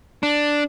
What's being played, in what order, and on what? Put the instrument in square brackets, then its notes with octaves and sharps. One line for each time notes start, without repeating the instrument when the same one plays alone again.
[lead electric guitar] D4